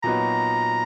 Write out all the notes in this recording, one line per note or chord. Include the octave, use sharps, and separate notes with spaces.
A#2 F#3 B3 D#4 F#4 A#5